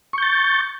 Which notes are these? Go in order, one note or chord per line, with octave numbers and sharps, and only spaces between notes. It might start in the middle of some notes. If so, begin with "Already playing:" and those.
C#6 G6 A6